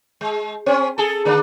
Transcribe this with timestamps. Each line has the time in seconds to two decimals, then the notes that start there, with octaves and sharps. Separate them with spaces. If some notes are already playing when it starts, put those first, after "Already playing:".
0.21 G#3
0.66 C4 C#4
0.98 G#4 A4
1.25 D3 A#3 D4